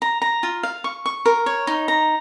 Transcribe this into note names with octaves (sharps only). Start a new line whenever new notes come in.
A#5
A#5
F4
F5
C#6
C#6
A#4
C#5
D#4
A#5